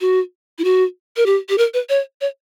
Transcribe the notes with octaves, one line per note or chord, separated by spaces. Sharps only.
F#4
E4
F#4
A#4
G4
G4
A#4
B4
C#5
C#5